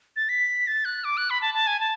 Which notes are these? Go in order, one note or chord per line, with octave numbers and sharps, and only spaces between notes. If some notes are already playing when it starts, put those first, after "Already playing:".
A6
B6
A6
F#6
D6
F#6
B5
A5
A5
G#5
A5